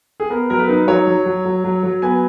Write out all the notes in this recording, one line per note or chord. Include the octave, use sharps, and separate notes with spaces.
G#4
B3 A#4
F#3 A#4
B4
D#4
F#3 C#5
F#3
F#3
F#3
F#3
F#3
B3 G#5